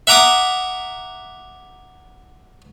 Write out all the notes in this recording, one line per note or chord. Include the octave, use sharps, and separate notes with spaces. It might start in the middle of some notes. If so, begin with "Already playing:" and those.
E5 F#5 A#5 D6 D#6